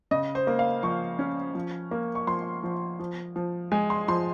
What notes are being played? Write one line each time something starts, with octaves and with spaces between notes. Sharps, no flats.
C#3 D#5
C5
A#3
F5
F3 C#6
C#4
F3
A#3
C#6
F3 C6
F3
F3
F3
G#3 G#5
C6
F3 C6